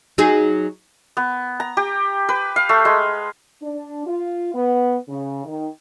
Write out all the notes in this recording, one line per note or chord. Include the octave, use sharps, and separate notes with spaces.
F#3 D#4 G#4
B3
A#5
G4
B4
F5
A3
G#3
D4
F4
B3
C#3
D#3